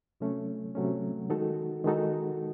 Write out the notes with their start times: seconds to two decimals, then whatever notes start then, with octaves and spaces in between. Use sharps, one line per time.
0.20 C3 F#3 A3 C#4
0.75 C3 F#3 A3 C#4
1.30 D#3 G#3 D#4 F#4 A4
1.84 D#3 G#3 D#4 F#4 A4